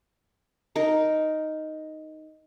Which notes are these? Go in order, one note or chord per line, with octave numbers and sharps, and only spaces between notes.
D#4 A#4